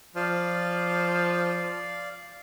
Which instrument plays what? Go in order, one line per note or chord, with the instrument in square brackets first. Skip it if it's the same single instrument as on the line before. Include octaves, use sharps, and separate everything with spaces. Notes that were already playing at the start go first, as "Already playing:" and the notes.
[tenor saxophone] F3 [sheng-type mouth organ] D5 F5